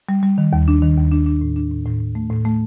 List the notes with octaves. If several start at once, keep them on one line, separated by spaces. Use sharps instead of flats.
G3
G3
D#3
D#2
D4
D#3
D#2
D4
D4
A2
D4
A2
A2
A2
A3
A2
A3